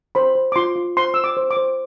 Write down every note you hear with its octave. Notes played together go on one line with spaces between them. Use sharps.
C5 B5
C5
D6
F4 C6
F4
C5 C6
C5 E6
D6
C5
D6
C5